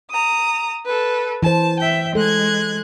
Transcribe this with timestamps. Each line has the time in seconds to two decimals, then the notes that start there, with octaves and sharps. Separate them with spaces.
0.10 A#5 D#6
0.86 A4 B4
1.43 E3 C5 A5
1.79 E5 G5
2.15 G#3 A4 F#6 G#6